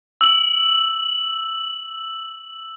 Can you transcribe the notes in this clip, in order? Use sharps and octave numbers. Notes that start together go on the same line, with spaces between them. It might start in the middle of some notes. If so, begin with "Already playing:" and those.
E6 F#7